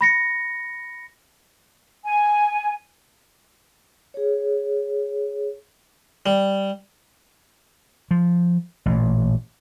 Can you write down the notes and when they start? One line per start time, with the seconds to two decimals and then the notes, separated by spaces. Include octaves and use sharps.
0.01 B5 A#6 C#7
2.04 G#5
4.14 G#4 C#5
6.26 G3
8.11 F3
8.86 A1 A#2